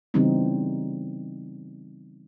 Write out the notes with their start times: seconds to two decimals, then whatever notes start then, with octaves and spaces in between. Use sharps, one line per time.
0.14 C#3 E3 G3 B3 C4 D#4